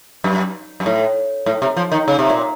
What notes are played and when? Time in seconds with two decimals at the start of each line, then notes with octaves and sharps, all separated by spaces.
0.24 F#2
0.80 F#2
0.86 A2
1.46 A2
1.62 C3
1.77 F3
1.92 D#3
2.08 C#3
2.19 C3
2.30 A#2